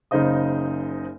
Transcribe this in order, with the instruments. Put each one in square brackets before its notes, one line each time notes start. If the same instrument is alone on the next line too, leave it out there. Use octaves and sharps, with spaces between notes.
[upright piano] F#1 C#3 D#4 C5 D#5 D#6